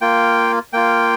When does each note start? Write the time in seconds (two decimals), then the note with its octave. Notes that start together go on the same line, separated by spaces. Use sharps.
0.01 A#3 F4 G5
0.73 A#3 F4 G5